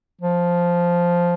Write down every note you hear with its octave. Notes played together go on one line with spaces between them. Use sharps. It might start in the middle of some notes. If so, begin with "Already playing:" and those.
F3